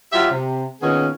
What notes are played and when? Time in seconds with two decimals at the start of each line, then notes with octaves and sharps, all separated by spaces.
0.13 F#3 F4 G4 E5
0.30 C3
0.81 A#2 D#3 B3 C#4 G#4